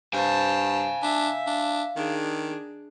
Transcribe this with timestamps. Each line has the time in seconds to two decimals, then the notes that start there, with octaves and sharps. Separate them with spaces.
0.13 G2 C5 F5 G#5 A5
1.02 D4 E5
1.47 D4
1.96 D#3 D4 G#4